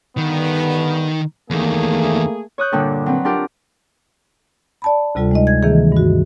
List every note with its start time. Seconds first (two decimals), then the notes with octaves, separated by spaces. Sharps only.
0.18 G2 D3 D#3 B3
1.50 E2 D#3 A3 A#3 G#4
2.58 C#5 D#6 F#6 G6
2.72 G2 A#2 D3 G3
3.06 F#3 C4 B4
3.25 D4 F4 G4 A#4
4.82 D5 A5 B5
5.15 D2 C3 G3 F4 A4
5.31 G#3 D#4 D#5
5.47 G#6
5.63 C3 D#3 E3 A#3 G#4
5.92 G2 F#4